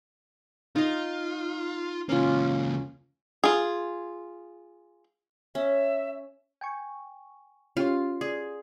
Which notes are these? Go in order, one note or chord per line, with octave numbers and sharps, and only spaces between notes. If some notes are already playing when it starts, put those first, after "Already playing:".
D#4 F4 D#5
C#2 A#3 C#4 F4
F4 G#4
C#4 E5
G5 G#5 C#6
C#4 F4 G4 C#5
G#4 D5